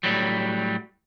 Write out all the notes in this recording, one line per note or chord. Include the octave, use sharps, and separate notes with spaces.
A2 F#3 G3